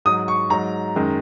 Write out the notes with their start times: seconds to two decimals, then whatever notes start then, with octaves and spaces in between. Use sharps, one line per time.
0.05 G#2 F#3 D#6
0.28 C#6
0.50 G#2 F#3 A#5
0.96 F#2 D#3 G#3